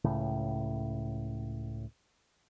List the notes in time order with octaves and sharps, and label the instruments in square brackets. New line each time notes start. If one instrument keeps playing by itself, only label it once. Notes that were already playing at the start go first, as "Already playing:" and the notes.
[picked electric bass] C#2 A2 C#3